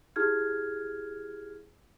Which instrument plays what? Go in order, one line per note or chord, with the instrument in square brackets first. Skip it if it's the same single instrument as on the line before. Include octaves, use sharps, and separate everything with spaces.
[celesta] E4 G4 G#4 F6 G#6